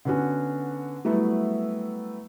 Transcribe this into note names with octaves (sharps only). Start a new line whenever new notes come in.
D3 B3 C#4 F#4
F#3 G3 A3 B3 E4